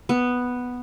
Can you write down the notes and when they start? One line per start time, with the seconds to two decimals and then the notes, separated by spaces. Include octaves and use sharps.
0.09 B3